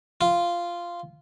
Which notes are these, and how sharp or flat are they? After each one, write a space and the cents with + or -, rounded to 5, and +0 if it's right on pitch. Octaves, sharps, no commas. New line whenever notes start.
F4 -10